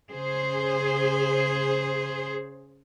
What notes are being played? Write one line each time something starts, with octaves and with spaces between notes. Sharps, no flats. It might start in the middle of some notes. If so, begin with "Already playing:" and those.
C#3 G#4 C5